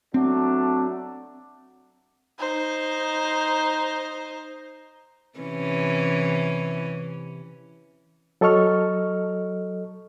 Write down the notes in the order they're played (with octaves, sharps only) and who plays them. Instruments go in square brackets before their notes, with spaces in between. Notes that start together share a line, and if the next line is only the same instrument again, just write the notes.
[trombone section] F#3 A3 D4 [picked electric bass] C4
[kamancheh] D#4 C5
[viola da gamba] C3 E3 C#4
[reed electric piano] F#3 A4 D#5 C#6 F6